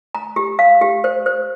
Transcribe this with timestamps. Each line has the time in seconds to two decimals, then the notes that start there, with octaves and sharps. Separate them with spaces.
0.15 A#5
0.36 G4
0.59 F5
0.81 G4
1.04 C5
1.26 C5